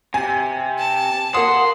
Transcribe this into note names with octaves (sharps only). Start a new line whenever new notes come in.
C3 G#5
A5
A#3 F#5 C6 D#6